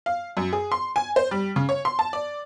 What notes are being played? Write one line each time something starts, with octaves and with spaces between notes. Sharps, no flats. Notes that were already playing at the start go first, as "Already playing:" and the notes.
F5
F#2
G#4
C6
G#5
C5
G3
C#3
C#5
C6
A5
D5